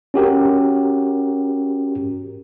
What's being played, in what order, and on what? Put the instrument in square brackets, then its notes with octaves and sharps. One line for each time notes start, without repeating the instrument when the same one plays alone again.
[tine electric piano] C#4 F#4 G4 A#4